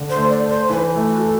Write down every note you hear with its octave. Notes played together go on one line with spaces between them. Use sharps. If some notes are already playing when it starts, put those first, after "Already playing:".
Already playing: D3
C5
A3
D5
A4
C5
E3 B4
A3
F#4
A4